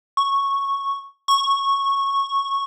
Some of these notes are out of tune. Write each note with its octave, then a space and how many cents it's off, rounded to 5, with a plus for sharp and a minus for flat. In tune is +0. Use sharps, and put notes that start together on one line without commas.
C#6 -5
C#6 -10